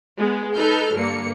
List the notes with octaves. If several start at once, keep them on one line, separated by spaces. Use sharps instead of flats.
G#3 B3
D#4 A4 B4 F6 G6
G2 D3 A#3 C#7